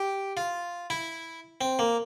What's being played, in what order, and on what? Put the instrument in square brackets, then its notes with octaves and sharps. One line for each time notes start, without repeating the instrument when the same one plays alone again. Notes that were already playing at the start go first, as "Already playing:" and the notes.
Already playing: [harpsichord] G4
F4
E4
C4
A#3